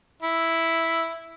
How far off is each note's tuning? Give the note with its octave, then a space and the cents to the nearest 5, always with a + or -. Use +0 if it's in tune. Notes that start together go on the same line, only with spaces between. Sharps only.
E4 +0